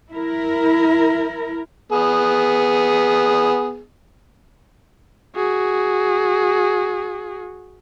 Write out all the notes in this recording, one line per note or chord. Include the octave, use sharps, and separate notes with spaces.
E4 A#4
B3 G#4
F#4 G#4